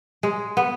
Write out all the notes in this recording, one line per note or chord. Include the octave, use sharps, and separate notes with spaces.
G#3
B3